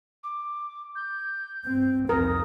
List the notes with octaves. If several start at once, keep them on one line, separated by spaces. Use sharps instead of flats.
D6
G6
G2 C4
C2 F2 A#4 D#6